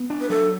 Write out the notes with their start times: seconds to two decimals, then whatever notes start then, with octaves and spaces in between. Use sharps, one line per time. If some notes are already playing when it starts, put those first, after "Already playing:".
Already playing: B3
0.10 D4
0.21 B4
0.30 F#3 A4